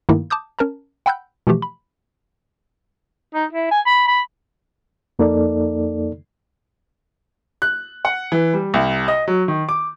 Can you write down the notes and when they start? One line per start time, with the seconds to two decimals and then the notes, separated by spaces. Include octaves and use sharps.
0.09 G2 D#3 A3 A#3 D#4 E4
0.30 A5 D6 D#6 G6
0.59 C#4 A#4 A5 A#5
1.06 F#5 G5 B5 E6 F#6 G6
1.47 B2 E3 F3 A3 G4
1.62 B5
3.34 D#4
3.53 E4
3.71 G#5
3.87 B5
4.08 B5
5.19 F2 A#3 D#4 A4 D5
7.62 F#6
8.05 F#5
8.32 E3
8.54 G3
8.74 C2
9.08 D#5
9.28 F#3
9.48 D#3
9.69 D6